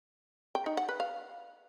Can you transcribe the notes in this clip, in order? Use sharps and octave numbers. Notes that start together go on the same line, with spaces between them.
G5
D#4
F#5
B4
F5